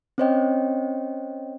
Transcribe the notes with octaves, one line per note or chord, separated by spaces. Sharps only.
C4 C#4 C5 C#5 D#5 G5